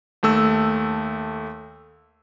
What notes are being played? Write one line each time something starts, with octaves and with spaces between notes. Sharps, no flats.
D#2 A3 E6